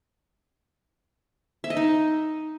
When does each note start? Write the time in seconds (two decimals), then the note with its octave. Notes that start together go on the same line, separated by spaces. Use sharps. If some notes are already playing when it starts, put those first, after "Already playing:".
1.64 E5
1.70 D#5
1.77 D#4